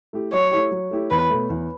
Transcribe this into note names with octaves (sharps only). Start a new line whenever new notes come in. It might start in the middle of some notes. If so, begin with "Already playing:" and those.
A3 E4 G4
F#3 C#5
A3 E4 G4
F#3
A3 E4 G4
E2 B4
B2 A3
E2